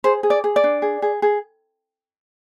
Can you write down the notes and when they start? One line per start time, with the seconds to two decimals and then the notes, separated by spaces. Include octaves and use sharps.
0.04 G#4 C5
0.23 G#4
0.30 D5
0.44 G#4
0.56 D5
0.64 D4
0.82 G#4
1.02 G#4
1.22 G#4